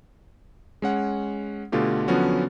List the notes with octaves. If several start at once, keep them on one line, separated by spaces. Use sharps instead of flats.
G#3 C#4 F#5
B2 D3 A3 F4 G4
D3 F3 F#3 B3 C#4 F#4